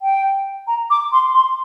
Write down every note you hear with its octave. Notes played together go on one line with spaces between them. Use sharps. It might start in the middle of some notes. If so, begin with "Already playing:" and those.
G5
A#5
D6
C6
C6